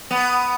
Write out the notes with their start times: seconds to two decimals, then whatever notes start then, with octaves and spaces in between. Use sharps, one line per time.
0.11 B3